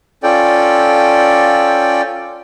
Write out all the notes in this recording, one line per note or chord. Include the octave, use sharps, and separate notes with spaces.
C#4 F4 A4 D5 G5